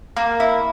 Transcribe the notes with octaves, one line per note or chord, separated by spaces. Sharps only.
A#3
E4